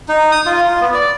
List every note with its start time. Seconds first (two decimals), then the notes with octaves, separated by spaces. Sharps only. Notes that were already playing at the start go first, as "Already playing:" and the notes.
0.09 D#4
0.32 D#6
0.46 F4
0.65 F4
0.80 B3
0.94 D5